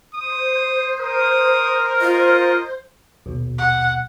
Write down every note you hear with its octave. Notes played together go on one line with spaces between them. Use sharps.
C5 D#6
A#4 D#6
F4 D#5
A#1 D#2 B2
F#5